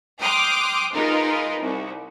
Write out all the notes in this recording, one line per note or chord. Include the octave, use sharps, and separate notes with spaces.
G5 C6 D6 D#6 F6 F#6
G#3 D#4 F4 A#4 B4
C2